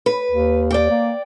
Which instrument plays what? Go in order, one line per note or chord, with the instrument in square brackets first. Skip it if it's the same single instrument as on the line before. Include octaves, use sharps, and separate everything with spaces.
[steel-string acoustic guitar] B4
[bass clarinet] D#2
[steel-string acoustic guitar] D5 G5
[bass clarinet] A#3